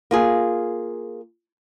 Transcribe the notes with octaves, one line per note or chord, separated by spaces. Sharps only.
A#3 F4 G#4